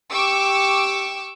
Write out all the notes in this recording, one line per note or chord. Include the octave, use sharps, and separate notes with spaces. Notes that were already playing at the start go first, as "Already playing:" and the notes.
G4 C#6 D6 E6